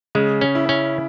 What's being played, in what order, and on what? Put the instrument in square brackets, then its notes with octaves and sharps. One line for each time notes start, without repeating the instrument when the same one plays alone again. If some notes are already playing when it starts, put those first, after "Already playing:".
[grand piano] C#3 [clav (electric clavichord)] G#3
[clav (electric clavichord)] C#4
[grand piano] E4
[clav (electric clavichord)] C#4